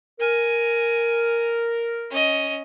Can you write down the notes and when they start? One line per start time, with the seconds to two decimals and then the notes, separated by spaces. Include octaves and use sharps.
0.20 A#4 G#5
2.11 C#4 D#5